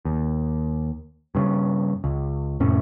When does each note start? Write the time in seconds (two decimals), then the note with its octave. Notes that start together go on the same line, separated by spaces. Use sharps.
0.05 D#2
1.35 G2 C#3
2.04 C#2
2.60 F1 A2 A3 C#4